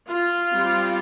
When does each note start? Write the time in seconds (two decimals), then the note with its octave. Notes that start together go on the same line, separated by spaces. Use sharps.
0.11 F4
0.54 G3 C4